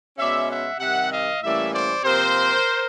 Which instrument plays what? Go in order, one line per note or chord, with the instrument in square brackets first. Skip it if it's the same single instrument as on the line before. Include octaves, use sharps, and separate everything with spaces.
[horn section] B2 G#3 C#4 D5 E5
E5 F#5
C3 D#3 G3 E5 F#5
D#5 F5
A2 E3 G3 A#3 C#4 D5 E5
C5 D5
C3 F3 A#3 A#4 C5